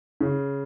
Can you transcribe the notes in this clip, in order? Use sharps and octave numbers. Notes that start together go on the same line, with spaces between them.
C#3